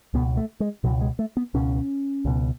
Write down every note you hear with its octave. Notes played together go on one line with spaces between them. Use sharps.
C#2 B2 B3
A3
G#3
C#2 B2 F#3
G#3
A3
B3
C#2 B2 C#4
C#2 B2